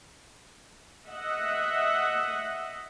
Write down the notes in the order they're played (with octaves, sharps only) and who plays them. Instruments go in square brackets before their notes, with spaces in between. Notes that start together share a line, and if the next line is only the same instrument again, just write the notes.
[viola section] D#5 E5 F#5